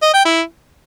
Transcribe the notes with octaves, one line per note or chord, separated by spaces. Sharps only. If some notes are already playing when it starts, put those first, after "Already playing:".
D#5
G5
E4